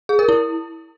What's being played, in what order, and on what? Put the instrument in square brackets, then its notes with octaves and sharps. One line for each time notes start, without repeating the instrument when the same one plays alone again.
[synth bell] G#4
A#4
E4